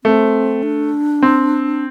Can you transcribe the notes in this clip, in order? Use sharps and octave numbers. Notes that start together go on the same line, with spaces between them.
A3 C4
D4
C4